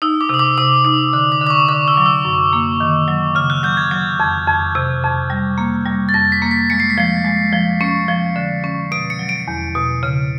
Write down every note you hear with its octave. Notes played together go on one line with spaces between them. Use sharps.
D#4 E6
D6
C3 D#6
D6
C3 D#6
D#4
D3
D6
D3
D6
C#6
D3 D6
E6
F#3
E6
F#2
A#3
D#3
F#3
C#3 F6
F#6
F#3 G6
G#6
F#3
F2
F2
C3
F2
G3
A#3
G3
A6
F2 A#6
B6
A#3
B6
G#3 C#7
C7
B6
F3 C7
G#3
F3
C#4 C#7
F3
D3
C#4
B2 D7
C#7
F#3
D7
E2
B2
C#3